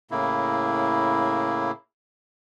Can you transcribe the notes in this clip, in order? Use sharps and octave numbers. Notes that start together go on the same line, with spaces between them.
A2 C#3 A#3 E4